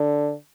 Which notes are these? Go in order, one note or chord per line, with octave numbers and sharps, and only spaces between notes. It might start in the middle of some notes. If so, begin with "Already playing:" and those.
Already playing: D3